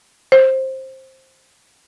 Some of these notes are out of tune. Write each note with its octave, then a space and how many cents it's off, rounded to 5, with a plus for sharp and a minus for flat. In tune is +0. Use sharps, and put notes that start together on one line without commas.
C5 +15